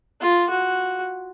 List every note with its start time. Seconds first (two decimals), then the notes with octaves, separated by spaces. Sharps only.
0.22 F4
0.50 F#4